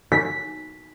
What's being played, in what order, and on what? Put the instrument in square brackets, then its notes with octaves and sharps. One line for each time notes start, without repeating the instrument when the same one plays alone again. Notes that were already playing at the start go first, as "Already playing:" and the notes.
[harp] B6